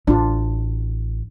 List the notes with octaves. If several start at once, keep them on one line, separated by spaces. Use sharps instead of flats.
A1 D4 F4